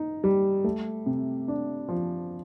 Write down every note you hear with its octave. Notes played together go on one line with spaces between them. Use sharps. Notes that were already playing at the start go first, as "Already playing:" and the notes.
Already playing: D#4
G3
A3
C3
D4
F3